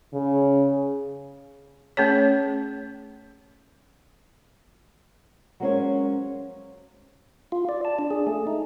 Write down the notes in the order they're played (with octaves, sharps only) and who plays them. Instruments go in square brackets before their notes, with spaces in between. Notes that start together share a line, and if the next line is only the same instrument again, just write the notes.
[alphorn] C#3
[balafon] A3 C#4 G#4 C#5
[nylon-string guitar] F#3 G#3 A#3 C#4 C5 C#5
[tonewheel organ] F4
D5
A5
D4
G#4
A3
D#4